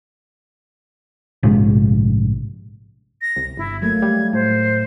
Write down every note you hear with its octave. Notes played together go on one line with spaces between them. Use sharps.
A#1 G#2 C3 G#3
A#6
C2
G1 E4
F#3 A3 A#3 G#6
G3
A2 C5